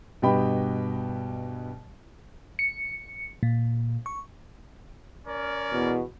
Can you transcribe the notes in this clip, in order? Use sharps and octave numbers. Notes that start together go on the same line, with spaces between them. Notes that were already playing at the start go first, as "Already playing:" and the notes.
G2 B2 G4 D#5 G5 B5
C#7
A#2
C#6
C#4 A#4 D5
E2 B2